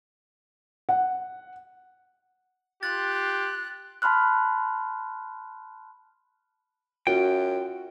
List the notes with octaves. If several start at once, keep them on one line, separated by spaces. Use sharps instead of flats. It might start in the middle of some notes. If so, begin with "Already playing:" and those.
F#5
F4 G4 C6 F#6 A6
A5 B5 C6 F6 F#6
F#2 C#4 F4 F#4 G5